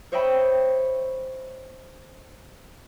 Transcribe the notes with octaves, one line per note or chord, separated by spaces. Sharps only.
C5 C#5 D#5 E5 G5 B5